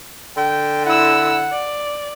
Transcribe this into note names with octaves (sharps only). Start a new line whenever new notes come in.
D3 G5
E4 F#5 E6
D5